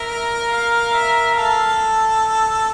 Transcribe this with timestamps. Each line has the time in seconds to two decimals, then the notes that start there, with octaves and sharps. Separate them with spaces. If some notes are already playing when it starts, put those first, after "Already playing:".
Already playing: A#4 E5
0.51 F5
0.93 E5
1.35 A4 F5